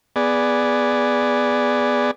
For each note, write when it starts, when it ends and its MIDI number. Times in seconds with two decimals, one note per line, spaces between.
0.16 2.11 59
0.16 2.11 68
0.16 2.11 74